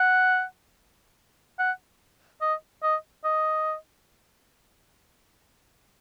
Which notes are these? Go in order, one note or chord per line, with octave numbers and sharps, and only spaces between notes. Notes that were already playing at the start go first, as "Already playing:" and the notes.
Already playing: F#5
F#5
D#5
D#5
D#5